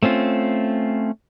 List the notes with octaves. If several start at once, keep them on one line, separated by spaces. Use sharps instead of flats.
A3 C4 C#4 F4